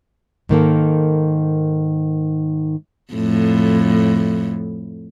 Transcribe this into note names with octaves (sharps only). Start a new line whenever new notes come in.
G#2 D#3 A#3 A4
F2 A2